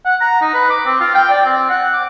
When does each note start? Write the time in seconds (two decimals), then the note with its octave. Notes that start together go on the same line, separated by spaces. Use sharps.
0.05 F#5
0.21 A#5
0.41 D#4
0.54 B4
0.70 D6
0.86 C4
1.01 F4
1.15 G5
1.30 D5
1.45 C4
1.69 F#5
1.93 D6